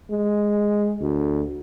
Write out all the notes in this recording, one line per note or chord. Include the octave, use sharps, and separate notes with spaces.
G#3
D2